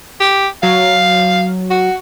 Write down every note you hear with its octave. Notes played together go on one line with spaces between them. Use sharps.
G4
F#3 F5
F#4